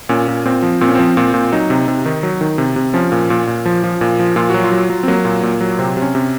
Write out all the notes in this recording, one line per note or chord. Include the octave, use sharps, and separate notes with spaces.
A#2 C#4
A#2
A#2 C4
F3
A#2 C4
C#4
F3 C4
A#2
A#2
F#3 D#4
C3
C3
D#3
F#3
D#3
C3
C3
F3 C#4
A#2
A#2
A#2
F3
F3
A#2
F3
A#2 F4
F#3 F#4
F4
F#3
F#3
C4
F#3 A#3
A#2
A#2
F#3
C3 C4
C3
C#4
C3